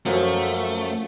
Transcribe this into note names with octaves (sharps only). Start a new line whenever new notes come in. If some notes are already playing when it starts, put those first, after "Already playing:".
F#2 F3 F#3 A3